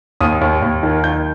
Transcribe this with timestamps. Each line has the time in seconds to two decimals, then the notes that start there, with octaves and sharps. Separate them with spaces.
0.21 D#2 D#6
0.41 D#2
0.62 D#2
0.83 D#3
1.04 D#3 G6